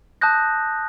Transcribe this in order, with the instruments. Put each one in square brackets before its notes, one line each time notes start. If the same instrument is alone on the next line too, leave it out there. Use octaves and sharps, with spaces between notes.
[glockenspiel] A5 D#6 F#6 G6 A#6